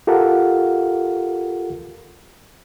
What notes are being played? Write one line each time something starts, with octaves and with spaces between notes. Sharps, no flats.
F4 G4 A4 A#4 F5 F#5